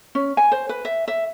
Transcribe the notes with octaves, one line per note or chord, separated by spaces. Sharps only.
C#4
G#5
C5
B4
E5
E5